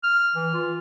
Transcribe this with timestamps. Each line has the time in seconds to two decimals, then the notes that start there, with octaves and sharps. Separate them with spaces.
0.04 F6
0.36 E3
0.54 F4